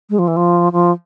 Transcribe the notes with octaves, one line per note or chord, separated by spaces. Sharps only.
G#3
F3
E3
F3
F3